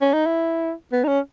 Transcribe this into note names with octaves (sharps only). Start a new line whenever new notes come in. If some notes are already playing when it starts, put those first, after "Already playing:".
C#4
D#4
E4
B3
D#4
C#4